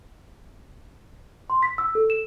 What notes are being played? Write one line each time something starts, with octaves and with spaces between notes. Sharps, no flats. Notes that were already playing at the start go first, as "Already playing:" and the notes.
C6
B6
E6
A4
E7